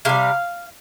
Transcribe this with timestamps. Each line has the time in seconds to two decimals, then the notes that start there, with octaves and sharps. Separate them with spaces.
0.05 C3 G3 F5